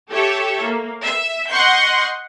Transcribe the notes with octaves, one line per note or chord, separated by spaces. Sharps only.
G4 A4 C#5 E5
A#3
E5
D#5 F#5 C6 C#6 G6